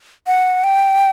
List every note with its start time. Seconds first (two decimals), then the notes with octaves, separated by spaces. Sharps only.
0.27 F#5
0.64 G5